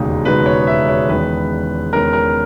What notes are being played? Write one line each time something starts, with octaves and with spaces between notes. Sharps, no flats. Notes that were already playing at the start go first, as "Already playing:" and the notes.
Already playing: E1 D#2 C#3 G#3 D#4
E1 D#2 C#3 G#3 D#4 B4
C#5
E5
C#5
E2 D#3 G#3 C#4 B4
E2 D#3 G#3 C#4 A#4
A#4